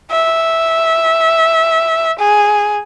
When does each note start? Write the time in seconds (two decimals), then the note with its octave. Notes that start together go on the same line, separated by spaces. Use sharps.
0.11 E5
2.19 G#4